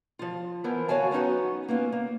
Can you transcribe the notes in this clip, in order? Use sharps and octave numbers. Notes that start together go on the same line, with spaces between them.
F3 F4
E3 B3 E4 A#4 C5
D2 F#4 C#5 F5 G#5 A5
F#3 B3 C#4 D#4 F#4
A#3 B3 C#4 F4
A#3